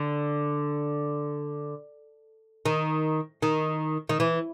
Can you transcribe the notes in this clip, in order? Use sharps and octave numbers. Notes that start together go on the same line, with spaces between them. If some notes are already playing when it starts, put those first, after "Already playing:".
Already playing: D3
D#3
D#3
D#3
E3